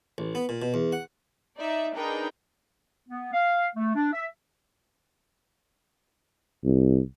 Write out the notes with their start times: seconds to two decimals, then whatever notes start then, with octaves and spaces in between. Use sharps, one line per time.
0.18 A1
0.35 B3
0.49 A#2
0.62 B2
0.74 E2
0.92 F#5
1.58 D#4 D5 E5
1.95 D4 D#4 G#4 A#4 B4 G5
3.09 B3
3.33 F5
3.76 A3
3.96 D4
4.13 E5
6.64 C2